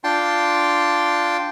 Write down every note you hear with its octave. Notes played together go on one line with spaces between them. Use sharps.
D4 F4 G5 A5 C6